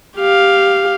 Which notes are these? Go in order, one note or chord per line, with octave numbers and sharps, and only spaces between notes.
G4 F5